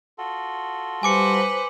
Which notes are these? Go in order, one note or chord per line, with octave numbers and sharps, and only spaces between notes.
F4 F#4 A4
G3 B4 C5 G#5 D6 C#7